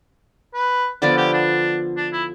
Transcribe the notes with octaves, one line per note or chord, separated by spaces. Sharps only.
B4
D3 F3 B3 F4 D5
G4
D4
D4
E4